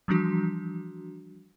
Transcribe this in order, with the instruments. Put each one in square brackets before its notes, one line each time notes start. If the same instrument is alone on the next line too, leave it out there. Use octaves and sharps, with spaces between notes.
[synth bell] E3 F3 G3 D4 F#4